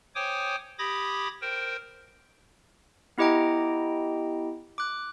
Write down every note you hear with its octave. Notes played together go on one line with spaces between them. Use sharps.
C5 C#5 G5 G#5 D6 D#6
G4 B5 D6 D#6 G#6 A#6
A#4 C5 G5
B3 E4 G4 D#5 G5 A#5
D6 F#6